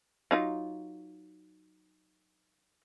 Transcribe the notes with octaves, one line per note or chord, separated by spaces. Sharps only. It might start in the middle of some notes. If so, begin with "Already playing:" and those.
F#3 D#4 F4